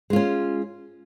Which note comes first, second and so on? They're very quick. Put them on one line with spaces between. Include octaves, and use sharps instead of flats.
G#3 F4 C#4